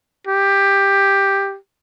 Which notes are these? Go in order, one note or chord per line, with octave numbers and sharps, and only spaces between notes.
G4